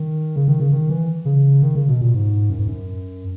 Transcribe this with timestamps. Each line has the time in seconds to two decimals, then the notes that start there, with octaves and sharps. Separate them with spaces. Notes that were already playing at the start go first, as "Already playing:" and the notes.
Already playing: D#3
0.36 C#3
0.48 D#3
0.60 C#3
0.72 D#3
0.90 E3
1.25 C#3
1.62 D#3
1.75 C#3
1.88 B2
2.01 A#2
2.14 G#2
2.50 F#2
2.59 G#2
2.68 F#2